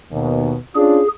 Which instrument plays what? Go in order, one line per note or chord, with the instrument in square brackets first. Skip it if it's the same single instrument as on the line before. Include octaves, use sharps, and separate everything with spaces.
[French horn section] D#2 B2
[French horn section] C#4 D4 F4 [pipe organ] G#4